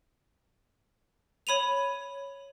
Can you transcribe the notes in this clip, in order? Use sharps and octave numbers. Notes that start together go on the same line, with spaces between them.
C#5 B5 D#7 F7